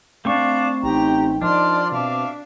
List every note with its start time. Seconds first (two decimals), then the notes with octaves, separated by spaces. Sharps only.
0.25 A3 C4 D4 F5 C#6 D6
0.83 A1 D#4 G4 G5 A#5
1.41 F3 D4 D#4 A#4 D5 D#5 C6 F6
1.92 B2 C4 E5 F5 D6